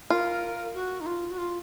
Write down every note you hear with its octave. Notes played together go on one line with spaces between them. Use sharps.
F4 A#4
F#4
D#4
F4
F#4
F4